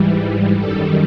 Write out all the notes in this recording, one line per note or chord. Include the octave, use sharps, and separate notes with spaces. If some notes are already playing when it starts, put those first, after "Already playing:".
Already playing: G#2 E3 G3
F#2 D#3 G3 A4